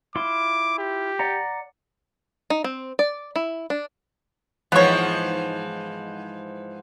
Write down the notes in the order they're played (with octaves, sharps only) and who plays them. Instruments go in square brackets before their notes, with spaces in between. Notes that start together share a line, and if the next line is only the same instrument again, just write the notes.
[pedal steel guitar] E4 F4 C6 [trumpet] D6
[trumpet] G4
[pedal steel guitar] D5 F#5 A#5
[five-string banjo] D#4
C4
D5
E4
D4
[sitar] G#2 E3 F3 [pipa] B3 C#5